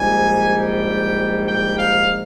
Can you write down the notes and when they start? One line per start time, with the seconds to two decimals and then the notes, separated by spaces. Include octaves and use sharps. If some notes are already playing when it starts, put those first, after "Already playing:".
Already playing: A#1 G#2 G3 G#5
0.56 G5
1.47 G5
1.78 F5